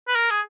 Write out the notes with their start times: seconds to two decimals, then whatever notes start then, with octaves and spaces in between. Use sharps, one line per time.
0.08 B4
0.15 A#4
0.31 G#4